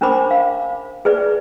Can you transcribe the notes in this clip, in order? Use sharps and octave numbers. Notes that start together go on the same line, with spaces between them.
C#4 D4 A#4 C5 B5 D6
F5
G#4 B4 D5